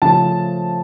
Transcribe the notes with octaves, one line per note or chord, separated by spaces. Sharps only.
C#3 F3 A3 A5